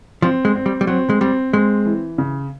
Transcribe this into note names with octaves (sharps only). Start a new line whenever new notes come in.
F3 C4
G#3
C4
G3
G3
F#3 C4
G#3
G3 C4
G#3 C4
E3
C#3